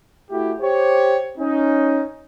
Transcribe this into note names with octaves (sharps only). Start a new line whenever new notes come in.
A3 E4 F#4 G4
G4 C5 C#5
C#4 D#4